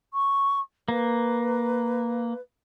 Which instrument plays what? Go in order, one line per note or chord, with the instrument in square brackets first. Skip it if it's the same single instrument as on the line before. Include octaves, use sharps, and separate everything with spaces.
[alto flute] C#6
[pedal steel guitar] A#3 [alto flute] B4